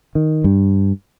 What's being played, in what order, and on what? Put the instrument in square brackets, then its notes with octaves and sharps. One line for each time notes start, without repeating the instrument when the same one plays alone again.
[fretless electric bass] D#3
G2